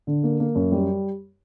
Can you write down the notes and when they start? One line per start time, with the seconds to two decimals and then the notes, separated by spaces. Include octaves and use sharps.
0.07 D3
0.23 A#3
0.40 A#3
0.55 F#2
0.72 G3